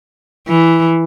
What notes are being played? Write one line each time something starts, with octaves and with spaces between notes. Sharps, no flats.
E3